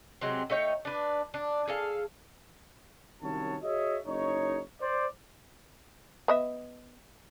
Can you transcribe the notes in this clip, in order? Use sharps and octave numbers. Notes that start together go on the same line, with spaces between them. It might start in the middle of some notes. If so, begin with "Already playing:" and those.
C3 F#3 G#3 C4
A3 D#4 C#5 G5
D4 B4
D4
G#4 A4 F5
C2 D#3 F#3 C#4 C#5 A5
F#4 G#4 C#5 D#5 E5
F#1 D#4 C#5
C5 D5
B3 D#5 E5